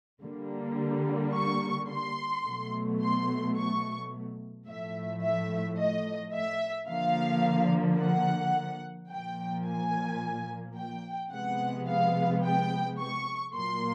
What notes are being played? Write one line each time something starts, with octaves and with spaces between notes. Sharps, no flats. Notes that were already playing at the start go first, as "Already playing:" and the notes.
D3 G3 A#3
C#6
C6
B2 F#3 A3
C6
C#6
A2 F3 A3 E5
E5
D#5
E5
D3 F3 A#3 F5
F#5
A#2 F3 A#3 G5
G#5
G5
C3 F3 G#3 B3 F#5
F5
G5
C#6
A#2 F#3 A#3 C6